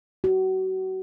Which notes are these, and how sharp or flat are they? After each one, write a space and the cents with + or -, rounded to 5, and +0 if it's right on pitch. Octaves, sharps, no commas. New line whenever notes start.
F#4 +30